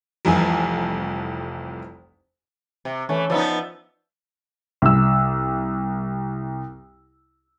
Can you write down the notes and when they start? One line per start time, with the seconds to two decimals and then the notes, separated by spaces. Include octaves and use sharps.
0.25 F1 C2 F2 E3 G#5
2.85 C3
3.09 E3 A3 C#4
3.30 F3 B3 D#4 D5 E5
4.82 C2 E6